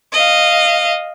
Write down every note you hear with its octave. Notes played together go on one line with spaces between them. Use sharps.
D#5 F5